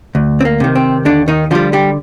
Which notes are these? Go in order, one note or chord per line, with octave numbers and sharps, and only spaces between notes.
D2
C4
A#3
C3 D#3
C4
D#2 D3 D4
D#3 D#4
D3 F3 G3 F4
G3 G4